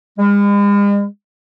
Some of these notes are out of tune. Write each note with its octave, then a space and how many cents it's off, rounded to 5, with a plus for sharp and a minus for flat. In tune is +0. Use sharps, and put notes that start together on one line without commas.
G#3 -45